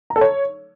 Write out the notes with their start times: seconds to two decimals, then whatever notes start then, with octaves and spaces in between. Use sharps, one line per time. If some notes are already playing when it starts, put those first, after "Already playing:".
0.10 A#5
0.16 A4
0.21 C#5